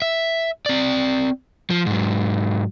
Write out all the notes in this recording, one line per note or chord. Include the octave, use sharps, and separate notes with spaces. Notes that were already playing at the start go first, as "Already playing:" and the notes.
E5
C4 D5
F3
G#2 F#3